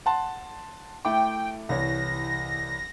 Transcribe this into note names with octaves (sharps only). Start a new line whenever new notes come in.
F#5 A5 C6
A3 E4 G5 D6
C2 E3 C#5 A#6